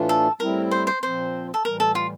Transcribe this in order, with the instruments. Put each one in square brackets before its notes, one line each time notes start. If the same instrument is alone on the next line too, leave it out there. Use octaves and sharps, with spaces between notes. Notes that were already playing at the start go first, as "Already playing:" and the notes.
Already playing: [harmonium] A2 E3 A3 D4 F4
[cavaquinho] A4
[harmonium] A2 G3 C4 E4 [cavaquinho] A#4
[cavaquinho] C5
C5
[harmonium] A#2 F3 C4 [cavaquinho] C5
[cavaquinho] A4
[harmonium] A2 E3 G3 [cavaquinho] A#4
[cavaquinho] A4
F4